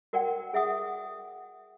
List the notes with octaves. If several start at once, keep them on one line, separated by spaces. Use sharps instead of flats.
F#4 A#4 D5 F#5 G5
G#4 E5 F#5 D#6